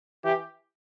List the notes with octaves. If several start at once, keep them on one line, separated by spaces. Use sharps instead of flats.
E3 G4